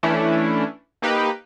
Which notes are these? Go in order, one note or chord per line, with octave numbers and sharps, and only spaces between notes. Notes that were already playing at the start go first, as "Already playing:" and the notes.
E3 A3 C#4 D4 E4
A#3 D#4 G4 B4